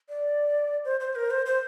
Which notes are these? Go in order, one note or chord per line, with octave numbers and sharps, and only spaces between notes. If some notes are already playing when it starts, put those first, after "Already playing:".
D5
C5
C5
A#4
C5
C5